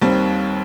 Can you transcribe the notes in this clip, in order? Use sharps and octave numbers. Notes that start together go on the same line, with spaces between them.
D#2 D#3 G3 C4